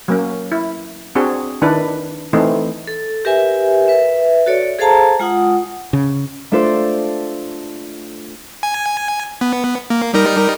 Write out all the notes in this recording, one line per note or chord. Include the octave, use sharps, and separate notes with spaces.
F#3 A#3 C#4
E4
C4 D4 F#4 G#4
D#3 D4 E4 B4
E3 A3 C4 D#4
A4
G4 A#4 B4 E5 G#5
B4 E5
F#4 A4 C#5 D5
G#4 A4 C5 F5 A5 A#5
G#3 F4 F#5 D#6
C#3
A3 D4 F4 A4 C5 D5
G#5
B3
A#3
G3 D#4 A#4